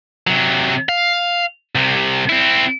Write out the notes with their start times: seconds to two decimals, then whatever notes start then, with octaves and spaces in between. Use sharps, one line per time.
0.27 C3 F#3
0.89 F5
1.75 C2 C3
2.29 C4 E4